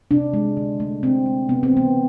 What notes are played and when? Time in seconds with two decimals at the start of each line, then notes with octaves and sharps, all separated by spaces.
0.11 C3 D4
0.33 G#3
0.57 D3
0.80 A3
1.03 C3 C4
1.26 G#3
1.49 C3 B3
1.63 C4
1.72 E3 B3